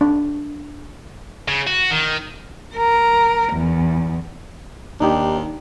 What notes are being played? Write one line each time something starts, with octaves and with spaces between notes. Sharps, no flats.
D4
C#3
F#4
D#3
A#4
E2
D#2 D4 D#4 G4